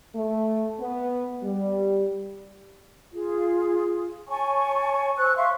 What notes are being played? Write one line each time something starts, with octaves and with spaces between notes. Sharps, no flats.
A3
B3
G3
F4 G#4
C#5 G#5 A5 C#6
C5 C#6 E6 F#6
E5 F5 C6 C#6